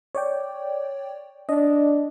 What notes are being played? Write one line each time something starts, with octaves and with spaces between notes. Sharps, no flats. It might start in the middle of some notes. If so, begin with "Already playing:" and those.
C#5 D5 G5
D4 D#5